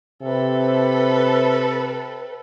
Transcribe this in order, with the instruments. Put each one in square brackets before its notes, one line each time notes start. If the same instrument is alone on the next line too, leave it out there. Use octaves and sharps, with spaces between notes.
[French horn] C3 [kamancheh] A4 B4